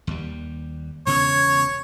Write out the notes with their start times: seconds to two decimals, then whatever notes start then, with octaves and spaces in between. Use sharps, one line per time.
0.07 D#2 G3
1.07 E1 C#3 B3 C#5